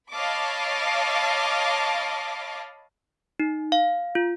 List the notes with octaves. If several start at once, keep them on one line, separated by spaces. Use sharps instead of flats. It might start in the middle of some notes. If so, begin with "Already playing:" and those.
C#5 D#5 F5 A5 B5 D6
D#4
F5
F4